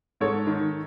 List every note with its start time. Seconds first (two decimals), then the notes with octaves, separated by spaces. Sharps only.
0.20 G#2 A4 C#5
0.47 D#3